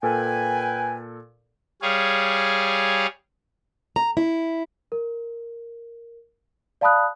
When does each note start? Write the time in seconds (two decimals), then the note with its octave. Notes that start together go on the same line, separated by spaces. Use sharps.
0.03 A#2 A4 B4 G5 G#5 F6
1.82 G3 G#4 C#5 F5
3.96 A#5
4.17 E4
4.92 A#4
6.81 D5 F5 A5 B5 D#6 F#6